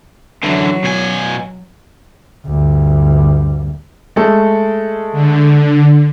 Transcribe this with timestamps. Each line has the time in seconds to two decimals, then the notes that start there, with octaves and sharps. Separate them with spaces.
0.44 D3 E3 F#3
0.84 B2 G#5
2.46 D2 G2
4.16 G#3 A3 A4
5.12 D3